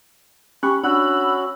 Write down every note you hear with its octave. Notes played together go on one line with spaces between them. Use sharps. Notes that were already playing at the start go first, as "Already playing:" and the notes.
C#4 G4 B5 C#6 F#6
C#4 D4 F#4 F#5 B5 E6 F#6